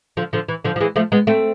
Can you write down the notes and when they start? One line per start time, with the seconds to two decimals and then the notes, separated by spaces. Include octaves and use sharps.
0.17 D3 F3
0.33 D3 F3
0.48 E3
0.65 D3 F3
0.76 F3
0.81 E3 G#3
0.96 F3 A3
1.12 G#3 B3
1.27 A3 C4